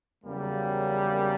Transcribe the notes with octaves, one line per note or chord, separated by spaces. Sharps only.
E2 C#3 F#3 G3 A#3